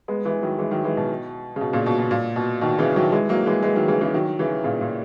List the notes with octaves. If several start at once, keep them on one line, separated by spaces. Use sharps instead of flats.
G#3 B3
E3 G#3
D#3 F#3
E3 G#3
D#3 F#3
E3 G#3
B2
C#3
B2
A#2 C#3
B2
B2
A#2
B2
B2 D#3
C#3 E3
D#3 F#3
E3 G#3
F#3 A#3
E3 G#3
E3 G#3
D#3 F#3
C#3 E3
C#3 E3
D#3 F#3
C#3 E3
A#2 C#3
A#2